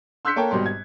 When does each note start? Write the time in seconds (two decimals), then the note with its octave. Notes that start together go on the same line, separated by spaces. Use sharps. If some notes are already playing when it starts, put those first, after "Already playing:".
0.25 C6 E6 F#6 G6 B6 C#7
0.36 A#3 A4 A#4 C#5 G5 A5
0.51 G#1 B2 G3 C6
0.66 G#6